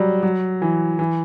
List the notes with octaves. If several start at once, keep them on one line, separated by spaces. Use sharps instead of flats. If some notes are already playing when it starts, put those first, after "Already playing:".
Already playing: F#3 G3
F#3
E3
E3